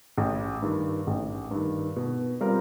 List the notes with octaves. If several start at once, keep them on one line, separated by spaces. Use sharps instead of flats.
A1
G2 D#3
A1
G2 D#3
B2
G3 C4 F4 A#4